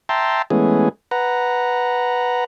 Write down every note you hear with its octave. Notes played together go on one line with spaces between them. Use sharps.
E5 G5 A5 A#5 C6
E3 G#3 A3 B3 C#4 G#4
B4 F#5 A#5